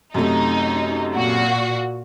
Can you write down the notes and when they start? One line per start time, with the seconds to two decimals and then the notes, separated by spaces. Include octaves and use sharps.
0.14 F#2 C3 A3 D#4
1.13 A#2 F#4